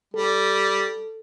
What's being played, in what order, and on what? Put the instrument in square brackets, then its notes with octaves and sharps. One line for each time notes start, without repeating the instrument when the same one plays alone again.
[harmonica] G3 [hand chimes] A4